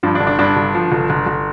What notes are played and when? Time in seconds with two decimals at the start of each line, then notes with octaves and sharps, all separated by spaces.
0.03 G2 F3
0.15 D4
0.20 G1
0.27 D4
0.39 G2 D4
0.56 G1
0.75 F3
0.92 G1
1.10 G1
1.26 G1